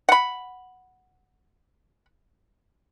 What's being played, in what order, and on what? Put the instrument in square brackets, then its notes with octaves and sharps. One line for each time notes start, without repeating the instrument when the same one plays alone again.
[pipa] F#5 B5